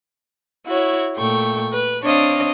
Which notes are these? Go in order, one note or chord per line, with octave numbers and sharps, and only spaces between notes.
E4 F#4 C#5
A#2 A3 G5 C#6
B4
C4 D4 C#5 D#5 F5